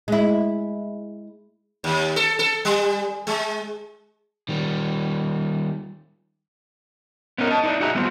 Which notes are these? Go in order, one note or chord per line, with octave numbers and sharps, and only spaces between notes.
G#3 E4
D#2
A4
A4
G3
G#3
D#3 G3
B3 C#4 D#4 A#4
D#5 A5
D#4 E4 C5 D5 D#5
D#4 F#4 G#4 E5 A#5
G3 B3 C4 F4